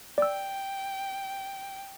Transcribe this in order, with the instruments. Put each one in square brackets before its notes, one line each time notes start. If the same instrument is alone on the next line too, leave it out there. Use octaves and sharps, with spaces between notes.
[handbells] D5 E6 [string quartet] G5